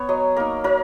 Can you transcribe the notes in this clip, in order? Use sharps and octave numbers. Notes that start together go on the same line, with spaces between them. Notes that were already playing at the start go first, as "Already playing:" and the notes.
Already playing: B3 C#5
F#3 D#5
A#3 D#4 A#4
F#3 A#4